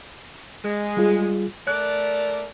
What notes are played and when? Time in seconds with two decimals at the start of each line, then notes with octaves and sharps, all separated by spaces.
0.63 G#3
0.97 G3 F4 G#4
1.67 A3 A#4 D5 F#6